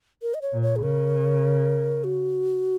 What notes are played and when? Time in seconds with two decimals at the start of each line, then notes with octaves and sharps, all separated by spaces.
0.22 A#4
0.34 D#5
0.42 C#5
0.53 A#2
0.62 C#5
0.76 G#4
0.82 C#3 A#4
2.04 F#4